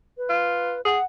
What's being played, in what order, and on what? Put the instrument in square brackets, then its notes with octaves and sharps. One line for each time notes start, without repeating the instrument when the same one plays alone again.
[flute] B4
[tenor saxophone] F4
[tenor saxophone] G#4 [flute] F#5